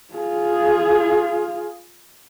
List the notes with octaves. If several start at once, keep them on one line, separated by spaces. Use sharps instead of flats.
F4 G#4